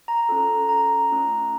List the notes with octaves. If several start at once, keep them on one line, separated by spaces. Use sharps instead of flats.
A#5
C#4 F4 A4
A#5
A3 C#4 F4